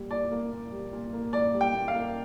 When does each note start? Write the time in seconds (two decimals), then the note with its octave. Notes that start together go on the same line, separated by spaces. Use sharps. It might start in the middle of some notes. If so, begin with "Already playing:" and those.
Already playing: A#2 G3
0.10 A#2 D5
0.31 A#3
0.52 A#2
0.72 G3
0.93 A#2
1.13 A#3
1.33 A#2 D5
1.53 G3
1.61 G5
1.75 A#2
1.88 F5
1.94 A#3